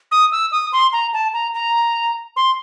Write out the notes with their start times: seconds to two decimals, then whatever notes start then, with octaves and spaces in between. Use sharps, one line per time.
0.12 D#6
0.32 E6
0.52 D#6
0.73 C6
0.93 A#5
1.13 A5
1.33 A#5
1.54 A#5
2.36 C6